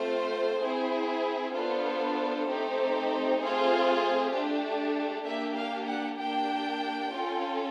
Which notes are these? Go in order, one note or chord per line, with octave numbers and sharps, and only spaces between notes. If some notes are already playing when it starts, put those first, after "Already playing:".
Already playing: A3 C4 F4 C5
C4 E4 G#4
B3 D4 F4 A4 C5
A3 C4 D#4 G4
A3 C4 F4 G#4
A3 D4 G4
A#3 D4 G4 E5
F5
F#5
A#3 D4 G4 G5
C#4 F4 A4